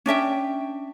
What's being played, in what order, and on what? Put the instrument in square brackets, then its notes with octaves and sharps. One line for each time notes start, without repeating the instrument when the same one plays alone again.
[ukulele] C#4 D4 E5 G5